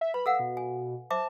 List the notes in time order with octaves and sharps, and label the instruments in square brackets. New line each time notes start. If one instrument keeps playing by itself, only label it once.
[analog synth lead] E5
[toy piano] B4 [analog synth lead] B5
[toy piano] A4 F5 F#5 [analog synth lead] E6
[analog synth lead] B2
[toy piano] G#5
[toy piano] C5 E5 D6 [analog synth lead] A5